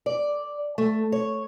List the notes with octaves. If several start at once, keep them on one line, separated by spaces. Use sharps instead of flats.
D5
A3
C#5